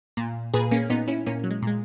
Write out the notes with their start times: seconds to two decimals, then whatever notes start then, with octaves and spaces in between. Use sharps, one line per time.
0.17 A#2
0.54 A#2 G#4 B4
0.71 A#3 C#4
0.90 A#2 B3 D#4
1.08 C#4 E4
1.26 A#2 A#3 C#4
1.44 F#3
1.51 G#3
1.62 A#2 G#3